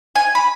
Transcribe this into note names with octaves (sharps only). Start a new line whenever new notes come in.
G#5
B5